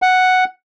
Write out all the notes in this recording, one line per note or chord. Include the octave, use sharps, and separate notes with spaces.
F#5